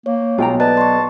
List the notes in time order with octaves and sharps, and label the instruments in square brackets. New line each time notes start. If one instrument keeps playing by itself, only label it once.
[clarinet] A#3 [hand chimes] C#5
[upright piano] B1 [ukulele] F4 G5 A#5
[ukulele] B4 [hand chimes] D5 D#5 [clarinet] A5
[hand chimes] C6 C#6